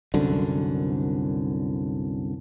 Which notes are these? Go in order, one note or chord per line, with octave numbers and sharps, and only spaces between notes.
C2 F#2 D3